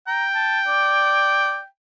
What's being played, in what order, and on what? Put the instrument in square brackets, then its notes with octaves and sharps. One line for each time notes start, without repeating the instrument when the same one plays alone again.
[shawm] G5 [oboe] A#5
[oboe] A5
D5